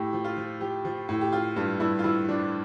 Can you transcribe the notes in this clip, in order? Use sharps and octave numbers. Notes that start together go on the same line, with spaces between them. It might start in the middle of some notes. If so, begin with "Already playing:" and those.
Already playing: A2 G4
F3
F4
F3
F3 G4
F3
A2
G4
F3 F4
G2 F4
G2 E4
F4
F3 E4
F3 D4